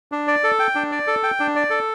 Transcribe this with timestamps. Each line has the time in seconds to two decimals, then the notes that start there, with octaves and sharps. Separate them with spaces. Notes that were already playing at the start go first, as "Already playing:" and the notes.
0.12 D4
0.28 D5
0.44 A4
0.59 G5
0.75 D4
0.92 D5
1.07 A4
1.23 G5
1.40 D4
1.56 D5
1.70 A4